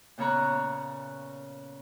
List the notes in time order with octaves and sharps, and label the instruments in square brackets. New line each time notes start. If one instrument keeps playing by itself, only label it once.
[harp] A#2 C#3 B3 C#5 A#5 F#6